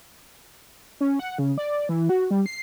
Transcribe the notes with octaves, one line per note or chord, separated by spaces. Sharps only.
C#4
F#5
C#3
D5
E3
F#4
G3
C7